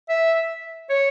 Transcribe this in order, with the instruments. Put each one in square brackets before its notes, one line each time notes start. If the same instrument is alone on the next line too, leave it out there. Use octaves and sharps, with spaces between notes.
[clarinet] E5
C#5